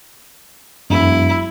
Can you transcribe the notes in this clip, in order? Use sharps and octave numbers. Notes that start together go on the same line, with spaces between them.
E1 F#2 E4